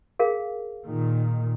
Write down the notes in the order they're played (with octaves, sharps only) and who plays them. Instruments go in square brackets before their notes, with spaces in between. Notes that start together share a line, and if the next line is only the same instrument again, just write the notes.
[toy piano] G#4 A#4 F5
[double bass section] A#2 D#3